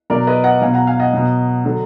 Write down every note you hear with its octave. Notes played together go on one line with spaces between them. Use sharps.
B2 F#3 A#4 D5
B4 D#5
D#5 F#5
B2 F#3 F5 G#5
F#5 A#5
F5 G#5
D#5 F#5
B2 F#3
D3 F#3